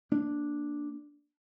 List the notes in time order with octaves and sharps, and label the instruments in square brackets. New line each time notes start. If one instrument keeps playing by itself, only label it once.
[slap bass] A#3 D4